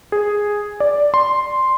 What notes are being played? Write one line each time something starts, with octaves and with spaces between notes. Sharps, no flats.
G#4
D5
C6